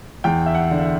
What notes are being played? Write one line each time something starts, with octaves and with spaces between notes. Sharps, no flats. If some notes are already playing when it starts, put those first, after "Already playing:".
E2 G5
E5
F#5
D3
E5